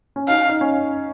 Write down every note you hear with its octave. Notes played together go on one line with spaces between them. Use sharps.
C#4
D#4 F5
D#4
C#4